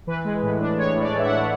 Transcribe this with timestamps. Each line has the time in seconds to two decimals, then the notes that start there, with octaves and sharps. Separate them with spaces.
0.07 E3 B4
0.25 G#3
0.43 A2
0.60 D4
0.77 G#3 C#5
0.96 A2
1.01 D5
1.14 E3 E5
1.25 F#5
1.32 D4